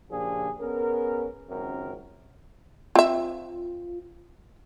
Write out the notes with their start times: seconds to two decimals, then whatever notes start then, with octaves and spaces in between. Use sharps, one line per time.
0.11 A#2 C#3 F3 D4 G4 G#4
0.61 B3 C#4 G#4 A#4
1.49 C#2 F#2 D#3 C4 A#4
2.95 C4 F4 E5